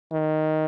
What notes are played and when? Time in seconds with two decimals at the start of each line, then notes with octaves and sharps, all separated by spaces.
0.12 D#3